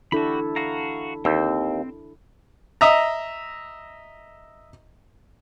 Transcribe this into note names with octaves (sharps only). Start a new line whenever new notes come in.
D4 E4 F#4 G4 A4 B5
F#4 F5 A#5
D#2 C4 E6 G6
D#5 E5 A#5